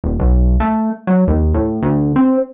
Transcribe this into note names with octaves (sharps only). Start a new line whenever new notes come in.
D#1
B1
A3
F#3
D#2
A2
D2
C4